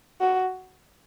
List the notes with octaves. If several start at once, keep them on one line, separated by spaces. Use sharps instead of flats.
F#4